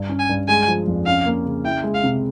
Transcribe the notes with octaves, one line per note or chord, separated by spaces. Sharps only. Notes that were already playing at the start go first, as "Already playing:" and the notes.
Already playing: G2
C#4
G#5
G2
G#3 G#5
F3
F2
C#4 F5
A#3
C#3
E4 G5
G#3
F5
C3